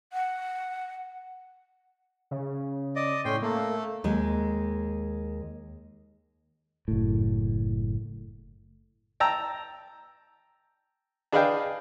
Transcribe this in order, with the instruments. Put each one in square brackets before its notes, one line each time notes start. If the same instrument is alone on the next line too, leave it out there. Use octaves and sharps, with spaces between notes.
[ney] F#5
[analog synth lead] C#3
[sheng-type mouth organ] D5 D#5
[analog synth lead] A2 [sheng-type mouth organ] C#4 G5 C6
[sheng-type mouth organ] A3 [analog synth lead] A#3
[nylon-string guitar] D#2 G#3
[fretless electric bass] F#1 A2
[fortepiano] G5 A5 A#5 E6
D4 G#4 B4 D#5 F5 G5